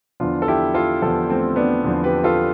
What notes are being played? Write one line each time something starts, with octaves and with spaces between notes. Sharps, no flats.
E2 D3 F3 D4 F4
A4
E4 G4
F4 A4
E2 D3 F3 F4 A4
A3 C4
B3 D4
E2 D3 F3
G4 B4
F4 A4